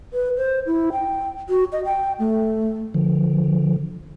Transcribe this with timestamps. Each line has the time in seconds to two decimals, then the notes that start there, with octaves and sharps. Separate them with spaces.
0.13 B4
0.37 C5
0.67 E4
0.92 G5
1.49 F#4
1.72 D#5
1.85 G5
2.19 A3
2.94 D3 F3